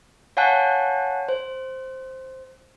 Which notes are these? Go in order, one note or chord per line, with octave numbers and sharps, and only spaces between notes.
C#5 F5 F#5 G#5 A5 F#6
C5